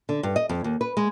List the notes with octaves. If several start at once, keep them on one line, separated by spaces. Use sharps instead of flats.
D3
G2
D#5
F2
D#2
B4
G#3